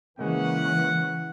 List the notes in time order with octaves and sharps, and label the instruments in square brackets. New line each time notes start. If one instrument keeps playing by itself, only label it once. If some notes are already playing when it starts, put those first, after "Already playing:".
[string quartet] C#3 [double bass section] E3 [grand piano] G#3 A#3 [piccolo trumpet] F#5